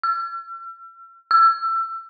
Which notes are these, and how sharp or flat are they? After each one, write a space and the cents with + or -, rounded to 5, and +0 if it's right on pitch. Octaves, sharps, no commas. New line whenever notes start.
E6 +45
E6 +25